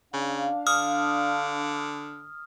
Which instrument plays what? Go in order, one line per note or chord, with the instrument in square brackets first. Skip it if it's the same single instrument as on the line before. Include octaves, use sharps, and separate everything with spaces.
[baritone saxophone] C#3 [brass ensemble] D4 F5
[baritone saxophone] D3 [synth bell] D#6 F6